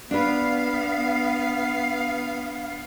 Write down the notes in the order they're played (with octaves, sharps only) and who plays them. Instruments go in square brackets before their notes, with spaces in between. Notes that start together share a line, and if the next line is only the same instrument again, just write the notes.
[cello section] B3 F5 [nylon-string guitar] D4 B4